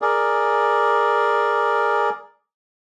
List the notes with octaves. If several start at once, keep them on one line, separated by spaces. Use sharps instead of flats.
G#4 A#4 D5